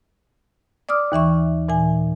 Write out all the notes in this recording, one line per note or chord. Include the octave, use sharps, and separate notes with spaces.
D5 D6 D#6 F6
D#2 E3 E5 C#6
A#2 E3 G#5